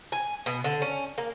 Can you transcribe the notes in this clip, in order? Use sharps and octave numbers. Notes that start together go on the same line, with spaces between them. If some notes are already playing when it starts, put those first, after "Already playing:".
G#5
B2
D3
C#4
A#3